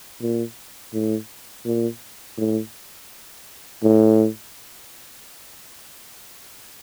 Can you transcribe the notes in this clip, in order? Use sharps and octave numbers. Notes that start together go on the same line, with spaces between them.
A#2
A2
A#2
A2
A2